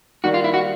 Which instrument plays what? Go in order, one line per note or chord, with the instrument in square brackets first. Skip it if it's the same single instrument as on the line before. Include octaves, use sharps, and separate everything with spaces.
[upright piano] D#3 G3 A#3 [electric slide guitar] F#4
[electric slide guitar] F4
E4
F#4